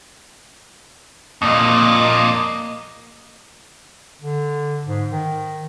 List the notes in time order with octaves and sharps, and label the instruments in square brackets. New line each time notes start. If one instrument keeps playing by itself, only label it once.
[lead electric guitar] F2 A#2 [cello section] A#3 D#5
[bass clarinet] D3
G#2
D#3